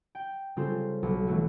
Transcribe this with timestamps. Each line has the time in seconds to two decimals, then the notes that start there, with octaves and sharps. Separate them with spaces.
0.15 G5
0.56 C#3 G3 C4 F4 A4 C5
1.03 B1
1.27 E3 F#3 A3 F#4